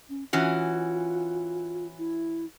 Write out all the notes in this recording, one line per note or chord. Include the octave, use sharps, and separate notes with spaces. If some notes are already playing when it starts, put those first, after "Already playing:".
C#4
E3 C#4 F4 F#4
E4